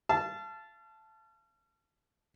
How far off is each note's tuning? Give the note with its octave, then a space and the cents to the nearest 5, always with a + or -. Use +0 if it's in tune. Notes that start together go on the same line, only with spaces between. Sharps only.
F5 -40 A5 -10